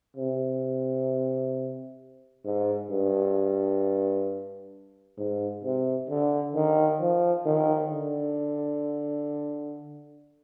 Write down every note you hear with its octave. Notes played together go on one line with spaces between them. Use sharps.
C3
G#2
G2
G#2
C3
D3
D#3
F3
D#3
D3